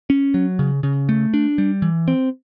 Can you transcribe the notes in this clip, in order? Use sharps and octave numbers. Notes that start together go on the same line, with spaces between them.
C#4
F#3
C#3
C#3
A3
D4
G3
E3
C4